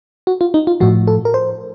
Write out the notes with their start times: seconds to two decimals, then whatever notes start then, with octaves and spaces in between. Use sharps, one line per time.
0.27 F#4
0.41 F4
0.54 D#4
0.67 F4
0.80 A2 F3 F#4
1.07 A4
1.25 A#4
1.34 C5